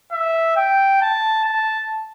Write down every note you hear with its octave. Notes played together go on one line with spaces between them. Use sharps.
E5
G5
A5
A5